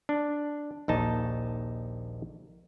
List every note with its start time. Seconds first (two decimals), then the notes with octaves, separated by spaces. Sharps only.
0.09 D4
0.88 A#1 D#2 D#4 A5